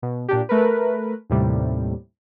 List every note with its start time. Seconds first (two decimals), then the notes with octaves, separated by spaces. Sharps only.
0.02 B2
0.28 A#2 D4 G4
0.49 A3 A#4 B4
1.30 D#2 A2 C3 G3